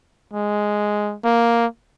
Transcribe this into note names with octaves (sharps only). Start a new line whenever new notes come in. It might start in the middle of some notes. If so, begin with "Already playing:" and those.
G#3
A#3